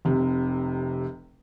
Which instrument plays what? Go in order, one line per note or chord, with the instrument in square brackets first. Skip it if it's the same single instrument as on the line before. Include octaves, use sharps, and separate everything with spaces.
[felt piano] F1 C3